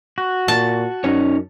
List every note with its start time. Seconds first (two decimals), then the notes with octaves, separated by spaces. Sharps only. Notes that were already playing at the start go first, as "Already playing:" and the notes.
0.18 F#4
0.48 A#2 A5
1.04 F#2 C#4 D#4 C#5